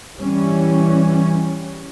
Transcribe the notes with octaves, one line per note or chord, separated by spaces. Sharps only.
E3 G3 C#4